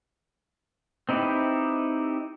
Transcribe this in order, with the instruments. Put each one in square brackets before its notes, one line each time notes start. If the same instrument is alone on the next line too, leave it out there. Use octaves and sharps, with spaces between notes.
[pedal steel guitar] C4 D#4 E4 G4 B4